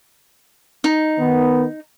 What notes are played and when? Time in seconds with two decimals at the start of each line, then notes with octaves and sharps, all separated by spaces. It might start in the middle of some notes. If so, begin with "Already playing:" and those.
0.84 D#4
1.19 D#3 B3